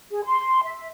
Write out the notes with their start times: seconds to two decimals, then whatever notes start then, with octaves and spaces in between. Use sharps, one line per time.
0.11 G#4
0.25 C6
0.64 E5